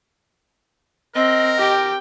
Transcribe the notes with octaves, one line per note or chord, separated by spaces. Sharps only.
C4 A#4 D#5
G4 G5